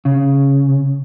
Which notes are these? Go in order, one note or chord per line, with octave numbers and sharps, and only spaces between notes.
C#3